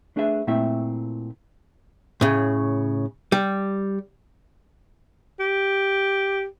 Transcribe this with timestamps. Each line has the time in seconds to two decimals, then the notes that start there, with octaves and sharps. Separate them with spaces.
0.16 A3 D4 G#4 B4 E5
0.47 A#2 A3 C4 E4 E5
2.21 A2 C#3
3.32 G3
5.40 G4